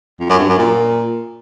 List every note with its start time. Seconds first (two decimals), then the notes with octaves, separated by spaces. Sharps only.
0.20 F2
0.30 F#2
0.39 G2
0.49 F#2
0.58 A#2